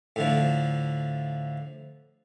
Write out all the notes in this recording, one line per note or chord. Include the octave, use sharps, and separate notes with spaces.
A2 D3 F3